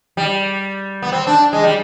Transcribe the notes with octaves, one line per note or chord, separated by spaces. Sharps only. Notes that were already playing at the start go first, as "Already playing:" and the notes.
G3
B3
C4
D4
G#3
G3